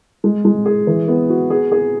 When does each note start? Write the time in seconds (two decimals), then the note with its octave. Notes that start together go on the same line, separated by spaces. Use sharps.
0.24 G#3
0.45 G#3
0.66 G#4
0.87 E3
1.08 B3
1.29 F#4
1.50 G#4
1.72 G#4